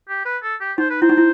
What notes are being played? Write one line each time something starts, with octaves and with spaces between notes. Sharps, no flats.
G4
B4
A4
G4
D#4 C5
B4
E4 C5
D#4
E4